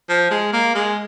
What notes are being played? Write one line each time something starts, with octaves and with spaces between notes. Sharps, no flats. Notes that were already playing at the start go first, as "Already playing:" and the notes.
F3
G#3
A#3
G#3